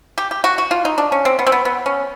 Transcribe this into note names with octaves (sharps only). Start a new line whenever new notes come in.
G4
G4
F#4
F#4
F4
D#4
D4
C#4
C4
B3
C4
B3
B3
C#4